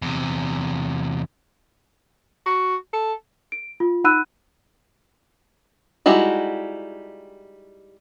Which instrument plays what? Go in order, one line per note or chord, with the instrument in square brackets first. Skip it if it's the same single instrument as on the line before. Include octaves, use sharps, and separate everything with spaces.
[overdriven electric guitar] E2 C3
[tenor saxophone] F#4
A4
[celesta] D7
F4
D#4 F#5 B5 E6 F#6 D#7
[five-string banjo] G3 G#3 D#4 E4 F#4